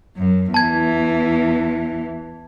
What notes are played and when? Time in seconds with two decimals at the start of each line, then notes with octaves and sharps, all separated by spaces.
0.17 F#2
0.54 E2 E3 A5 G#6